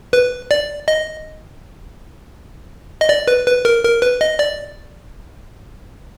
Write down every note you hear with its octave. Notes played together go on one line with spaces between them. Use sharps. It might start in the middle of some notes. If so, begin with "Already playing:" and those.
B4
D5
D#5
D#5
D5
B4
B4
A#4
A#4
B4
D#5
D5